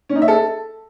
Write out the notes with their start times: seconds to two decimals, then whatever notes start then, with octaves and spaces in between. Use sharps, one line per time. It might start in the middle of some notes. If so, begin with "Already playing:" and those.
0.09 C#4
0.16 D#4
0.22 E5
0.28 A4